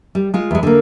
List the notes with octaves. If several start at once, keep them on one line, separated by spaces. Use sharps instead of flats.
G3
G#3 F4
E2 G#3
D3 A#3